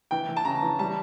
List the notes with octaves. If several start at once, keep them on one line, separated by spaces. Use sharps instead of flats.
E3 G5
E3
A5
C#3 A#5
E3
G3 A5